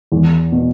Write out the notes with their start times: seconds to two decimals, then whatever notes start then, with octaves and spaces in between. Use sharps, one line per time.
0.12 E2
0.52 B2